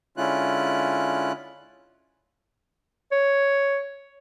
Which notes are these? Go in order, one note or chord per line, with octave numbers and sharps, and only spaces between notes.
D3 G#3 C#4 E4 F4 F#6
C#5